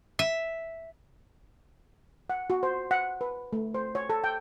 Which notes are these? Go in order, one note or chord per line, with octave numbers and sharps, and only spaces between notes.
E5
F#5
F#4
C5
F#5
B4
A3
C5
C#5
A4
G5